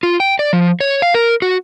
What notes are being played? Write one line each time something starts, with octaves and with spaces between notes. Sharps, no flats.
F4
G5
D5
F3
C#5
F5
A#4
F#4